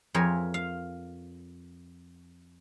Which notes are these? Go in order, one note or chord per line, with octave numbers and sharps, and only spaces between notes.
F2 G#4 A#4 C#5 E5
F5